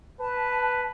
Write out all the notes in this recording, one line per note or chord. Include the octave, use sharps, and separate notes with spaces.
B4 A5